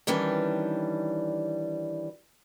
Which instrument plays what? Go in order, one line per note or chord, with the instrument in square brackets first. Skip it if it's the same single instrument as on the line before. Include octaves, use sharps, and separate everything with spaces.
[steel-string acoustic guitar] D#3 E3 G3 C#4 D4